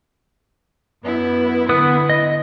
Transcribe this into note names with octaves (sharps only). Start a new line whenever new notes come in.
F#2 B3 E4
D3 E3 B3 E4 B4 D#6
D#5